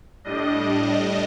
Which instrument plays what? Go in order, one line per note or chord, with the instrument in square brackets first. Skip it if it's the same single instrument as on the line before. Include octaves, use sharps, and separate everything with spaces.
[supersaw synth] A2 G3 D4 D#5